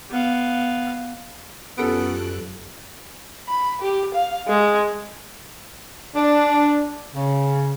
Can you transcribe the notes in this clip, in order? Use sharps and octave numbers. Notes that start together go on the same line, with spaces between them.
B3 F5
F#2 B3 C#4 F4 G4 A4 F#6 D7
B5
G4
F5
G#3
D4
C#3